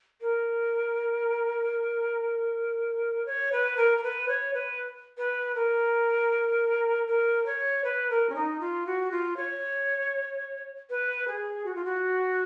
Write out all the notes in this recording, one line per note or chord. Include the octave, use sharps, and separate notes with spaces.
A#4
C#5
B4
A#4
A#4
B4
C#5
B4
B4
A#4
A#4
C#5
B4
A#4
C#4
D#4
F4
F#4
F4
C#5
B4
G#4
F#4
F4
F#4